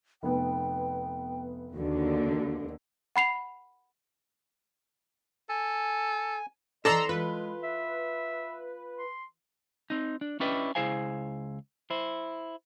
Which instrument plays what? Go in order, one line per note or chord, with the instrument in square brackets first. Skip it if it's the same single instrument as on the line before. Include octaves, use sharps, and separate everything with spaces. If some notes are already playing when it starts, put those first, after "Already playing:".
[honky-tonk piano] F1 B3 [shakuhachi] G5
[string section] D#2 D3 [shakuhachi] F#4
[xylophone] F#5 B5 C7 F7
[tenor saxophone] A4 [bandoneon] G#5
[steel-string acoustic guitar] E3 C4 [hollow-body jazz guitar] A4 D5 [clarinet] D#5 [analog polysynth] A#5 C6 E6
[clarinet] G#3 [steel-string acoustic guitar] F4 [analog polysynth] B4
[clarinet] E5
C6
[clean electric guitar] C4 D#4
D4
C#4 D4 E4 G4 B4 D#5
C#2 E4 G#4 C5 F5 G#5
E4 C5